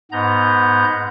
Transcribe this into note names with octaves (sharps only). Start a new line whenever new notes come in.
G#2 B3 A#5 G6